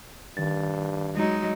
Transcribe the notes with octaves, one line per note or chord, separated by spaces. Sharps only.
G2 D#3 A6
F#3 G#3 D#4